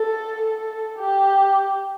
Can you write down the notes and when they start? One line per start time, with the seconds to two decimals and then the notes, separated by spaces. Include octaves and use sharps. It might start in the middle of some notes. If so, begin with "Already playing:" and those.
Already playing: A4
0.41 A4
0.98 G4